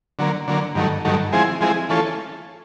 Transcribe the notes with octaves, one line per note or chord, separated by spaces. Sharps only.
D3 F#3 A#3
D3 F#3 A#3
G2 D#3 F#3 A3
G2 D#3 F#3 A3
F3 G#3 C4 E4 G#4
F3 G#3 C4 E4 G#4
E3 A3 C#4 F4 A4